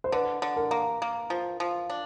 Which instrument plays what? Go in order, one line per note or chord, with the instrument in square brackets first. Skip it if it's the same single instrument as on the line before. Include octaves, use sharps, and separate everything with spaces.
[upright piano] C5
[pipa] D3 [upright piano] B4
[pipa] D3
[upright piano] A#4
[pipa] A#3
A#3
F3
F3
D4